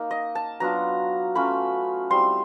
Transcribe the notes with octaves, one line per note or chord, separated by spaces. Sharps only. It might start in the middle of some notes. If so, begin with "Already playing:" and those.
Already playing: A#3 D#4
D#5
A5
F#3 B3 D4 F4 A#5
F#3 A3 C#4 F4 B5
G3 C4 E4 C6